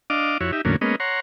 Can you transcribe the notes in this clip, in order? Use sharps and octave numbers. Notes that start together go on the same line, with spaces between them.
D4 D#5 F5 D6
F2 E4 F#4 C#5
D#4 G4 E5
E2 A2 D3 F#3 A#3 C#4
G#3 A#3 B3 C#4 D#5
C#5 F#5 A#5 C6